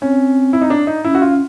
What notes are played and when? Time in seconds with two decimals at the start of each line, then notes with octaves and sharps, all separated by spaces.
0.02 C4 C#4
0.53 E4
0.62 D#4
0.70 D4
0.87 D#4
1.05 C#4 E4
1.15 F#4
1.22 F4